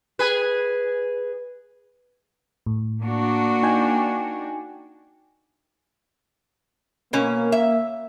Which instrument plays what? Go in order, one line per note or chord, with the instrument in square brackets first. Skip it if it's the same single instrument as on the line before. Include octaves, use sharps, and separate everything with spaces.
[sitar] G#4 B4
[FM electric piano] A2
[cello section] A#3 D4 F#4
[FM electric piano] D#4 G5 G#5
[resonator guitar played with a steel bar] B2 C#4 [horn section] A#3
[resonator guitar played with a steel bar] E5